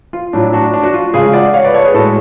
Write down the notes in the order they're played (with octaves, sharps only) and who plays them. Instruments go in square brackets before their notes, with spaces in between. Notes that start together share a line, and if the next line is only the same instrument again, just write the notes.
[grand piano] F4
A2 F#3 D4
D4 F#4
D4
F#4
F4
C#3 G#3 F4 G#4
D5 F#5
C#5 F5
B4 D5
A4 C#5
G#4 B4
A2 G#3 F#4 A4